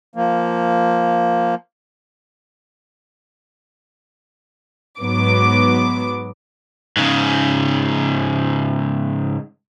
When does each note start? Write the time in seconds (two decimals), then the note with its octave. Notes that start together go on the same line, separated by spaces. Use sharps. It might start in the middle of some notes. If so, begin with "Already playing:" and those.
0.15 F3 A#3
5.00 G#2 F#3 B3 D6
6.97 G#2 C#3